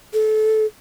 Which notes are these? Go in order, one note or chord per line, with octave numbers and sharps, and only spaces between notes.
A4